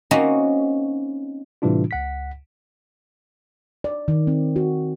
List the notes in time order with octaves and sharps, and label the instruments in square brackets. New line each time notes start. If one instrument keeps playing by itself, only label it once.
[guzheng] A#3 C4 C#4 D#4 F#4
[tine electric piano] A2 C3 E3 G3 D4 F4
C#2 F#5 B6
[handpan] D5
D#3
C4
F#4